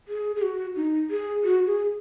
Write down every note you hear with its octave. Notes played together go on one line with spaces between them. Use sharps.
G#4
G#4
F#4
D#4
G#4
F#4
G#4